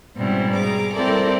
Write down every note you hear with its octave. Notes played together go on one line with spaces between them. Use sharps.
G#2 B2 G3 C4 C#4 E4
G#4 A#5 D6
G3 C4 E4 A4 A#4 D5